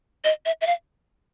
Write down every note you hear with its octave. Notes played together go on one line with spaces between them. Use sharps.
D#5
E5
E5
F5